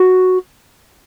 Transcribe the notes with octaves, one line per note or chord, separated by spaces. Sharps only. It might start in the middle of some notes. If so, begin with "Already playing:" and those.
Already playing: F#4